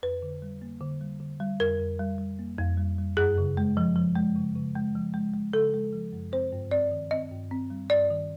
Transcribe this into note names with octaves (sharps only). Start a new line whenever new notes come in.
F2 B4
D3
G3
A#3
D3
G3
D3
G3
F2 A#4
F2
G3
G3
A#3
F2
G3
G3
F#2 G#4
C#3
G#3
F3
F3
G#3
C#3
C#3
G#3
F3
G#3
G#3
C#3 A4
G#3
F3
F#2
C4 C5
G2
C4 D5
D#3
C4 D#5
G2
C4
G3
G2 D5
D#3